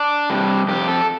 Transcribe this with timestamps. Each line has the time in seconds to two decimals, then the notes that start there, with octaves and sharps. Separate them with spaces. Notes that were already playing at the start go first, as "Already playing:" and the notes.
Already playing: D4
0.30 C3 G3
0.68 F2 G4
0.88 A4